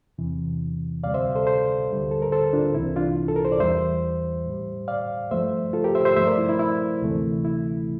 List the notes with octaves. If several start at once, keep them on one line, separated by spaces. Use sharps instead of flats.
E2 C3 E3
D2 C3 G3 D5 F5
C5 E5
A4 C5
A4 C5
D2 D3 G3
A4
A#4
A4 C5
D4 F4
C2 C3 E3 E4
D4 F4
A4
A#4
C5
D5
E2 E3 G3 C5 E5
A2 G3
D5 F5
G2 F3 A3 C5 E5
F4 A4
G4 A#4
C5 E5
C5 E5
G2 F3 A3 C5 E5
A#4 D5
E4
E4
E4
D2 C3 E3 A3
E4